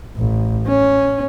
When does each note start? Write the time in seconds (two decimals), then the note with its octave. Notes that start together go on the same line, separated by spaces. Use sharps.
0.17 A1
0.68 C#4